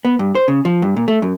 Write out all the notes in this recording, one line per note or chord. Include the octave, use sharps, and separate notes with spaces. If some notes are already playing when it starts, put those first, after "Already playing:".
B3
G2
C5
C#3
F3
G2
A#2
A3
F#2